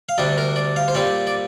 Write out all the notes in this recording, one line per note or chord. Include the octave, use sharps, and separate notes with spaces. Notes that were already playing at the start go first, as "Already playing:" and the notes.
F5
D2 C3 G3 D4 D5
A#4
D5
F5
C5
A#2 G3 C4 D5
D5